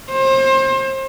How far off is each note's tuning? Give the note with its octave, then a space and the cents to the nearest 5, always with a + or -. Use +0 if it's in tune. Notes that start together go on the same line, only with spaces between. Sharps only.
C5 +30